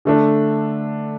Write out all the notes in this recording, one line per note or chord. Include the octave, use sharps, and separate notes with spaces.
D3 A3 D4